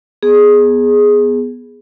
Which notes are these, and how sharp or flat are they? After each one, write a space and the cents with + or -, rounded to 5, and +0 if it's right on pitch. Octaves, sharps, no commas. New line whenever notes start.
B3 +0 G#4 +0